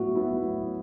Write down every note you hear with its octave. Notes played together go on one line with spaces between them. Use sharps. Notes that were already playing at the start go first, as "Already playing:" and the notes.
Already playing: A2 F#3 B3 E4 F#4
F#3 B3 E4
A2